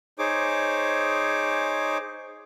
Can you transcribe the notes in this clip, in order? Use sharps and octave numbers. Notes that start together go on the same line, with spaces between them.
D#4 G#4 C5 C#5 D6